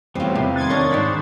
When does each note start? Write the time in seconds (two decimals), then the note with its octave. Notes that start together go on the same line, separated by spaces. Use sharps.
0.15 E2 A2 G3 B3 C4 F4
0.35 C3
0.56 D#3 D#4 C6 F#6 G#6 A6
0.70 D4 A#4 C#5
0.91 G#2 D4 C5 F#5 B5